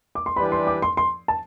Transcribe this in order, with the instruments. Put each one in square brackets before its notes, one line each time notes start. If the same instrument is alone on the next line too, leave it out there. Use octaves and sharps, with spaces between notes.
[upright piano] D6
C6
[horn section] E3 G3 D4 G4 B4 [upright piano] B5
[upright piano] C6
D6
C6
C6
A5